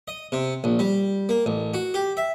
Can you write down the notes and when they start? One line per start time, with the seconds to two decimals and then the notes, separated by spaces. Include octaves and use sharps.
0.08 D#5
0.32 C3
0.64 A#1
0.79 G3
1.29 A#3
1.46 A1
1.74 F#4
1.94 G4
2.17 E5